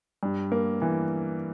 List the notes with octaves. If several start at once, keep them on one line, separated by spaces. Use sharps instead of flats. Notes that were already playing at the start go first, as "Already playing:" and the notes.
G2
A#3
E3